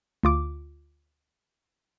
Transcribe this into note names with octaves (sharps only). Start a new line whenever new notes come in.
D2 F4 D6